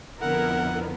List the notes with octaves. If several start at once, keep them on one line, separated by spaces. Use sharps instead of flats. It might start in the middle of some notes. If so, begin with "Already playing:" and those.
F2 D3 B3 E4 A#4 F#5